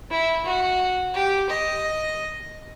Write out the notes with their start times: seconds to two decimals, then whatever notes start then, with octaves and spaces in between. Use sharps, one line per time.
0.10 E4
0.45 F#4
1.14 G4
1.49 D#5